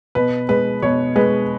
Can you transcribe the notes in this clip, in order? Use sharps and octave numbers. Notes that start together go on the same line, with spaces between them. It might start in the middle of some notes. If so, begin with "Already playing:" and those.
B2 B4
G#3 B4
B2 C#5
G#3 B4